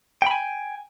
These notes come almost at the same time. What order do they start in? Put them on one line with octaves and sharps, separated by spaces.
G5 B5 G#5